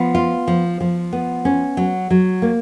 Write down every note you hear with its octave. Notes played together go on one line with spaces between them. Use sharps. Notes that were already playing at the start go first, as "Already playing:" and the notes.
Already playing: F3 B3
F4
F3
F3
B3
C#4
F#3
F#3
A#3